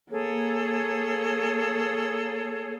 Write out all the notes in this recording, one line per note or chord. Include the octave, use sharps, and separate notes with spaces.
A#3 G#4 A4 C#5